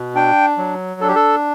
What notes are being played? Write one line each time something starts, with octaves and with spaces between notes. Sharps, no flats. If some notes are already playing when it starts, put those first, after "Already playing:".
Already playing: B2
D4 G5
F#3
D4 A4
G4
A4